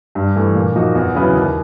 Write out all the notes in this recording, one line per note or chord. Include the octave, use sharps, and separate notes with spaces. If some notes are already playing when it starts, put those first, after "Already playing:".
G2
E3 A3
A#2
F3 A#3 D#4 F#4
E2
C#3 F#3 B3 E4
D#2